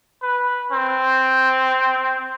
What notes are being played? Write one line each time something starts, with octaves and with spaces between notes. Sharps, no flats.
B4
C4